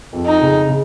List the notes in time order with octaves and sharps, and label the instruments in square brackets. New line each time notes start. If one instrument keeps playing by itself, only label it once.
[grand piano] F2
[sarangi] D#4
[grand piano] C#3
C#3